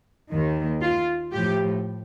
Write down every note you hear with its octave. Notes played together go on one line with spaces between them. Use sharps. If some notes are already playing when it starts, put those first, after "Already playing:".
D#2 D#3
F4
A2 F3 G4